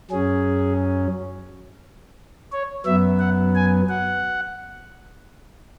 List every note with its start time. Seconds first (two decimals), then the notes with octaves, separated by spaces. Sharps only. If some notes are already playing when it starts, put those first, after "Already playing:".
0.11 F#2 F#3 C#4 G#4
2.52 C#5
2.85 F#2 F#3 B3 E5
3.20 F#5
3.55 G#5
3.89 F#5